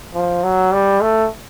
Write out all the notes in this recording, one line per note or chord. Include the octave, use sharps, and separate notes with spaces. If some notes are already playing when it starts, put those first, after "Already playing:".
F3
F#3
G3
A3